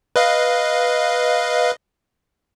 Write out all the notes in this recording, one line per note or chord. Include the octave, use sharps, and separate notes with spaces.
B4 D#5 F5